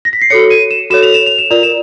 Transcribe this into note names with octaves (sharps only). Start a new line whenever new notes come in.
A#6
B6
C7
F#4 A4 C#5 C#7
D#7
E7
F#4 A4 C#5 E7
F7
E7
F7
E7
F4 A#4 D5 F7
E7